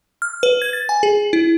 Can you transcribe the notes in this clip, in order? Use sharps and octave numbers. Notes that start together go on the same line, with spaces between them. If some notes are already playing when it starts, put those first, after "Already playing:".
F6
B4
G#6
A6
G#5
G#4
E4